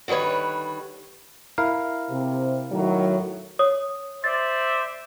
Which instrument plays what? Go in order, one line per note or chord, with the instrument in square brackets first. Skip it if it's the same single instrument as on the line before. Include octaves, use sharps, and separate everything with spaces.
[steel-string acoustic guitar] D3 D#3 G3 B4 C#5
[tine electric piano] E4 A#4 F5
[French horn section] C3
A2 D#3 F#3
[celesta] C#5 D#6
[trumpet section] C5 D5 E5 [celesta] A6